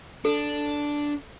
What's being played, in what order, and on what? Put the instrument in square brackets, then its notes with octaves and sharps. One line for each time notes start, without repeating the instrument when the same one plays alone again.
[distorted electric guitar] D4 [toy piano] A4